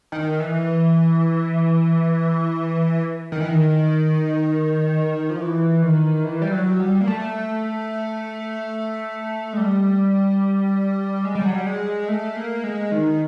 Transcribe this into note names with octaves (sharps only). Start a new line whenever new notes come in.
D#3
E3
D#3
E3
D#3
F3
E3
D#3
E3
G3
F#3
G3
A#3
A3
G#3
G3
G#3
G3
F#3
G3
G#3
A3
A#3
G#3
D#3